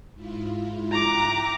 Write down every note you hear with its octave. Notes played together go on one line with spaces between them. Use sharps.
G#2 E4 F4
E5 G5 A#5 D6 F#6